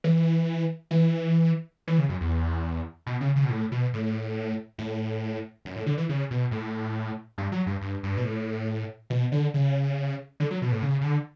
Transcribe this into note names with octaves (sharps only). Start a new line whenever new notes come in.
E3
E3
E3
C#3
F#2
E2
B2
C#3
C#3
B2
A2
B2
A2
A2
F#2
A2
D3
E3
C#3
B2
A2
G2
F#3
G2
G2
G2
B2
A2
B2
D3
C#3
D3
F#3
B2
A2
C#3
C#3
D3